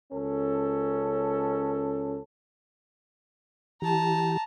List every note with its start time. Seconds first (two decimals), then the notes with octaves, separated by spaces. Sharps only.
0.12 C#2 C#4 A4
3.82 E3 G4 A5 A#5